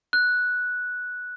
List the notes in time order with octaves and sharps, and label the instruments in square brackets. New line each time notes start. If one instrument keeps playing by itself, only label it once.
[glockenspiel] F#6